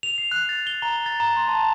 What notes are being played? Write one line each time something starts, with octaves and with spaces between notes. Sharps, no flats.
F7
C7
F#6
A6
G7
A#5
A6
A#5
C6
A5